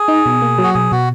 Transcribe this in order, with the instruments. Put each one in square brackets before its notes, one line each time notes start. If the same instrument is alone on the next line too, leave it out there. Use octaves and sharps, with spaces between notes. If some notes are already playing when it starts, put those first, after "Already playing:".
Already playing: [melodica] G#4
[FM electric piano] D#4
B2
A#3
F#3
[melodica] F#4
[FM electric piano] B2 [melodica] G#4
[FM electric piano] B2 [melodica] F#4